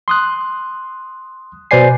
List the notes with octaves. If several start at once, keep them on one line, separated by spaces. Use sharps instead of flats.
C6 D#6 F#6
B2 B4 C5 D5 G#5 C7